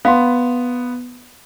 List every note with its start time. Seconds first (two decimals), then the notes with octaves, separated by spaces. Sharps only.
0.05 B3 F5 F#5 C6